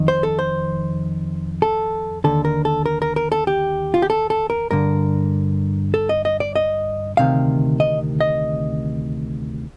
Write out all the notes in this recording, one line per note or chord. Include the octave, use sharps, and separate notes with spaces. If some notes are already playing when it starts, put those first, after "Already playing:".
Already playing: F2 D#3
C5
A4
C5
A4
D#2 D3 A4
A#4
A4
A#4
A#4
A#4
A4
G4
F4
G4
A4
A4
A#4
G2 D3 A#4
A4
D#5
D#5
D5
D#5
D2 C3 D#3 F5
D#5
D#5